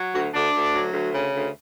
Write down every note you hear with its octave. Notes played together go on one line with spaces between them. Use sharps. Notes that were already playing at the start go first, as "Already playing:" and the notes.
Already playing: F#3
D2 F#4
D2 D4
D2
F#3
D2
C#3
D2